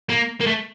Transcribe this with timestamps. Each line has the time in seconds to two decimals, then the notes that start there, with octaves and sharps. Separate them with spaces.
0.10 A#3
0.41 A#3
0.47 A3